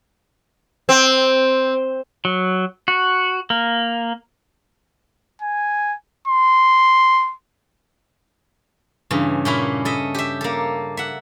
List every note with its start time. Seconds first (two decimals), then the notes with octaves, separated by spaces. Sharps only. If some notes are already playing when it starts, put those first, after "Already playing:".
0.89 C4
2.25 F#3
2.88 F#4
3.50 A#3
5.42 G#5
6.27 C6
9.11 G2 C#3 E3
9.45 A#2 C#4 E4
9.85 A4 D#5 E5
10.15 G4 E5
10.41 A#3 A4
10.97 E5 F#5